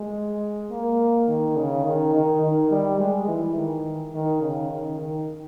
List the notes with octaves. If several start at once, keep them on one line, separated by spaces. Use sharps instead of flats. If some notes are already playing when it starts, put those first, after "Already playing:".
Already playing: G#3
A#3
D#3
C#3
D#3
D#3
D#3
G3
G#3
E3
D#3
D#3
C#3
D#3
D#3